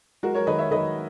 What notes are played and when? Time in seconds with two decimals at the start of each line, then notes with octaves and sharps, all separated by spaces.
0.23 G#3 F#4 A#4
0.34 A#4 C#5
0.47 D#3 B4 D#5
0.59 C#5 E5
0.71 D#3 B4 D#5